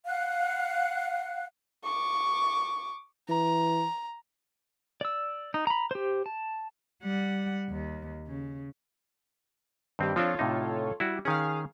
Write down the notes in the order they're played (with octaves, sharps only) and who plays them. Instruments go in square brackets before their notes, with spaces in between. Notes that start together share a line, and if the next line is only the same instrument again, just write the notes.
[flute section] F5 F#5 F#6
[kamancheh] C#6 D6
[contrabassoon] E3 [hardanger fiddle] A#5
[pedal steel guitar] D5 E6
D#4
A#5 B5
G4 C5
A5
[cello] G3 F#5
D#2
C#3
[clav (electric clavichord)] G2 C4 [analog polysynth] D#3 G3
[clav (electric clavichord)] F3 C4 D4 [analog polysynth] F4 A4 C#5
[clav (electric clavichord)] A2 C3 D#4
[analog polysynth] G3 [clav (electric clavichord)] E4 F#4
[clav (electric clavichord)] D#3 C#4 [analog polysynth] G#4 F5